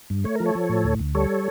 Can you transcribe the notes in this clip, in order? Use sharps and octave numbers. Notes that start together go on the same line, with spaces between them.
G2
A3 C#5
F3 A#4
A4 C#5
F3
A2
D2
D2
G3 A4 C#5